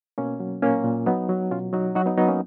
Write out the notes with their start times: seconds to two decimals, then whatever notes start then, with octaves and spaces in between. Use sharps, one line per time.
0.18 B2 A#3 C#4
0.40 F#3
0.62 A#2 A#3 C#4
0.84 A#2
1.06 F#3 B3 D#4
1.29 F#3
1.51 B2 C#4 F4
1.73 F#3 D#4 F#4
1.95 F#3 D#4 F#4
2.06 B3 D#4
2.17 F#3 B3 D#4
2.28 A#3 C#4